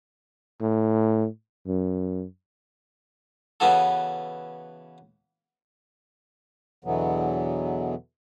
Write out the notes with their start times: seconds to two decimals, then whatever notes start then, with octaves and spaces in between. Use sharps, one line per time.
0.61 A2
1.67 F#2
3.60 C#3 E3 B3 C#4 F#4 A4
6.84 E2 B2 D3 E3 F#3 B3